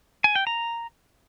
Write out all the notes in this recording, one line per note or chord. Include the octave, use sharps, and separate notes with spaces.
G#5
G5
A#5